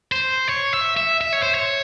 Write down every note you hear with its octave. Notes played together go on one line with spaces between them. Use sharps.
C5
C#5
E5
E5
E5
C#5
C5
C#5